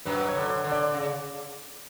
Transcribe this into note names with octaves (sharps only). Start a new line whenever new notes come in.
F#2 F#3 B4
C#5
D3
C#5
D3
D5
C#3